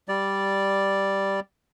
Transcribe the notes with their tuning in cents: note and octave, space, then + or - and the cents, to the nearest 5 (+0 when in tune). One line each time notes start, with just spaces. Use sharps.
G3 +0 D5 +0